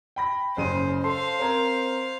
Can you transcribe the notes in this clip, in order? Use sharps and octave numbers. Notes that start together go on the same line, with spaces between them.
G5 B5 A#6
F#1 C#3 C5 D#7
A4 C5 F5 C6 C7
C4 A#4 G#6